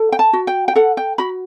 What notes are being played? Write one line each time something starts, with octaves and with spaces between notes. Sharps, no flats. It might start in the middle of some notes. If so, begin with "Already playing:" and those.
Already playing: A4
G5
A5
F#4
G5
G5
A4 F#5
G5
F#4 B5